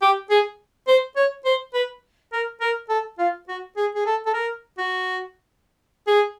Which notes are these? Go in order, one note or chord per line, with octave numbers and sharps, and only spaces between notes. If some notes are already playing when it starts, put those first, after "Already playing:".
G4
G#4
C5
C#5
C5
B4
A#4
A#4
A4
F4
F#4
G#4
G#4
A4
A4
A#4
F#4
G#4